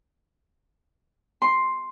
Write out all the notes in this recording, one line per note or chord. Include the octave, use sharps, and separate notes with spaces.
C6